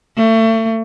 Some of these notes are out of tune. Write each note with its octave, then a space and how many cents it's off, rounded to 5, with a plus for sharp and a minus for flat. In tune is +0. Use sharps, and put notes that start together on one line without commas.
A3 +35